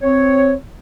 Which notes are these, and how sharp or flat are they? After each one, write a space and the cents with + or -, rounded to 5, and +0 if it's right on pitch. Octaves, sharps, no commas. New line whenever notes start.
C4 +0 C#5 +0